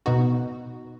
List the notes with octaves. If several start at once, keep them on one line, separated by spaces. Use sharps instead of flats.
B2 B3 D#4 F#4